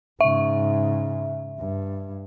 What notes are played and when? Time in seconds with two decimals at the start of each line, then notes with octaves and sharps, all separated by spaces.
0.21 G#2 C#3 E5
1.59 G2